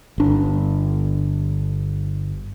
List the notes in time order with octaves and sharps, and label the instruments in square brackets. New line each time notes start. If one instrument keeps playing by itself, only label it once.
[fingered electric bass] G1 D4